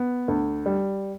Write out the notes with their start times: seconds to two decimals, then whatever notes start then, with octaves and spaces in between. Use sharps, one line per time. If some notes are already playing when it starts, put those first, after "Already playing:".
Already playing: B3
0.28 D2
0.66 G3